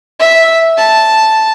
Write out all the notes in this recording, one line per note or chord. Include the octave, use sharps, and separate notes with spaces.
E5
A5